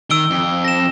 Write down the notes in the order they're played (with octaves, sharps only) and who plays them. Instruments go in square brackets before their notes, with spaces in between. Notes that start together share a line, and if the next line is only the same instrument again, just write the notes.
[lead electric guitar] D#3 [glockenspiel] E6 D7 G7
[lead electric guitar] F2
[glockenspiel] A#6 E7